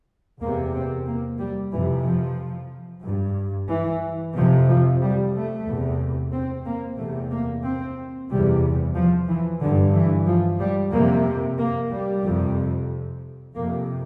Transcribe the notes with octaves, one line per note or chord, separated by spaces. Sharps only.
E2 C3 A#3
C4
A#3
G3
F2 C3 E3
F3
G2
E3
F2 C3 F3
F3
G3
A3
E2 C3
C4
A#3
E2 C3 A3
A#3
C4
E2 C3 G3
F3
E3
G2 D3
E3
F3
G3
F2 C3 A#3
A#3
G3
F2 C3
F2 C3 A#3